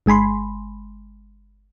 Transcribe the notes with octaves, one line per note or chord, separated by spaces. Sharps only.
G1 G#3 G#5 B5 C6